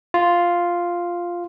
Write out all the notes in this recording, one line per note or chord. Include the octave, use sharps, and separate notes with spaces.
F4